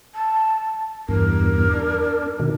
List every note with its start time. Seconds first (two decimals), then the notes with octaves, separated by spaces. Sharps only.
0.15 A5
1.09 E2 G2 A#4
1.69 D4
2.40 B2 D#3